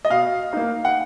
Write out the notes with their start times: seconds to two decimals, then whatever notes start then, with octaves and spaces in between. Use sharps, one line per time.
0.05 D#5
0.10 B2 F5
0.53 A#3 D#4
0.85 F#5